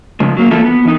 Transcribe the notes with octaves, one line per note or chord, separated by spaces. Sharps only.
C#3 F3 G#3
F#3 A#3
E3 A#3 E4 F4 A4
B3
E3 D#4